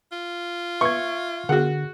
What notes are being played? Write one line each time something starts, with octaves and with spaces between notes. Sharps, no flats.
F4
B4 E5 C#6 G#6
D3 F#4 G#4 A#4 F#5